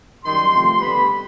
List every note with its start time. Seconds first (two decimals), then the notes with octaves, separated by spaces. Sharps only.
0.24 F#2 D#3 G3 C6
0.52 C3 F3 A3 C4
0.80 D3 G3 B3 B5